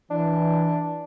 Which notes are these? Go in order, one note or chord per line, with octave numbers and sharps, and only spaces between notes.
E3 D4